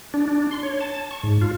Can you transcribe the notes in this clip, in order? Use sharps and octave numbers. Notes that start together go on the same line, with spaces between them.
D4
D4
C6
C#5
A5
C#6
G#2
F4